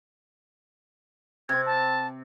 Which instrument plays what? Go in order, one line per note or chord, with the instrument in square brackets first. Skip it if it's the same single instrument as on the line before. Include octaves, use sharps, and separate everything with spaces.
[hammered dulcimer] C3 C4 [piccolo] G#6
[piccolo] A5